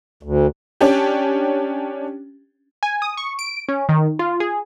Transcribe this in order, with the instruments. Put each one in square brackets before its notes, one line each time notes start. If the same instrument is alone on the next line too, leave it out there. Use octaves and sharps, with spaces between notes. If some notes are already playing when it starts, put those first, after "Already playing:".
[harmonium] D2
[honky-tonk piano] C#4 D4 G4
[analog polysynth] G#5
D#6
C#6
D7
C#4
D#3
F4
G#4